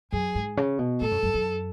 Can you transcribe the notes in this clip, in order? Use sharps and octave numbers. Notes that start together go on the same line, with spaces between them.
F#2 G#4
G#2
C#3
B2
A2 A4
F#2
F#2
F#2